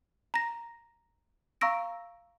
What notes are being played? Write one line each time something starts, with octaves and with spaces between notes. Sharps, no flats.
A#5 A#6
F5 A#5 C#6 E6 A#6 D7